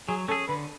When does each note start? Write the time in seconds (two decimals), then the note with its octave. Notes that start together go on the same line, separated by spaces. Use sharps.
0.08 F#3 G#4
0.28 C#4 G#4 A4
0.48 D3 B4